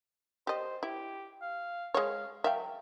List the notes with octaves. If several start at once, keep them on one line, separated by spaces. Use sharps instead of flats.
G4 C5 D#5
E4 G4
F5
G#3 C#5 F5
F#3 E5 F5 G5